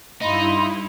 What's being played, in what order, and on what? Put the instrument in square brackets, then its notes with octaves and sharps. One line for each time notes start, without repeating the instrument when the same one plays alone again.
[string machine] G2 E4 [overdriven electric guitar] D#4 [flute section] F5 B5 C6